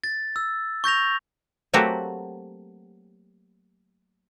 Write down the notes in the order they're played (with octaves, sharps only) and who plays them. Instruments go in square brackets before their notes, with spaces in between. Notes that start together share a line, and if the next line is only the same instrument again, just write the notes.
[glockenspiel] A6
E6
C#6 G6 A#6 F7
[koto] F#3 A3 A#3 C4 F#4 G4